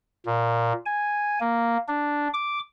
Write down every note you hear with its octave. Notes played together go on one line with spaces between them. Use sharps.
A#2
G#5
A#3
D4
D6